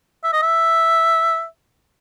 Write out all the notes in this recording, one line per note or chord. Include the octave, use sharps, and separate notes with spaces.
E5
D#5
E5